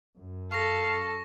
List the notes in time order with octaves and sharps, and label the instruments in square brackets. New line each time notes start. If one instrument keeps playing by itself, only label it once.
[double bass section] F#2
[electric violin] A4 [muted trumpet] F5 [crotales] C#6 A#6